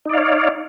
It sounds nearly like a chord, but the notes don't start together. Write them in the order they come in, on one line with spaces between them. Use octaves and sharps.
D#4 D5 F5 C#5